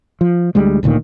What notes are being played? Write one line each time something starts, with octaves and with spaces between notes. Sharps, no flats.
F3
D2 G3 G#3
D#1 D2 A#2 D#3